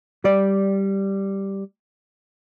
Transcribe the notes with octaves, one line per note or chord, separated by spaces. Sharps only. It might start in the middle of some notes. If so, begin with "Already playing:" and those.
G3 D5